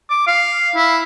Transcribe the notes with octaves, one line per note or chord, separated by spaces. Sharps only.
D6
F5
E4